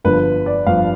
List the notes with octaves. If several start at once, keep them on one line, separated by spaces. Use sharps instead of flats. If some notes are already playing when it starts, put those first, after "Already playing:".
G1 G2 D3 F3 B4
D5
G1 G2 D3 F3 F5